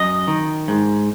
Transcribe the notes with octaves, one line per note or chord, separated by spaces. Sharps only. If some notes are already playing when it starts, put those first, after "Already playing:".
Already playing: F#2 D#5
D#3
G#2